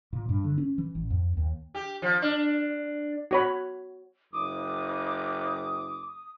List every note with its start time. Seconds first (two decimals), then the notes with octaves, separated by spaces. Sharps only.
0.13 A#2
0.29 G2
0.44 D3
0.58 C#4
0.78 E3
0.95 A1
1.10 F2
1.37 D#2
1.75 G4
2.02 F3
2.22 D4
3.31 F#4 C#5 B5
4.33 F#1 D6 D#6